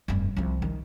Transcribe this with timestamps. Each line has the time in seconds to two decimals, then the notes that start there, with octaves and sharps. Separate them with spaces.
0.08 F1 G2
0.37 C2 F3
0.62 D#3